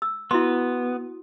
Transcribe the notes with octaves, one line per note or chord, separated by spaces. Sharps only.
E6
B3 E4 F#4 C6